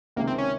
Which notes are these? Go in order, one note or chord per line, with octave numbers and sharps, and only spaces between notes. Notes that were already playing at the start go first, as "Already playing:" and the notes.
C#2 C3 D#3 G#3 A#3
C4
C#4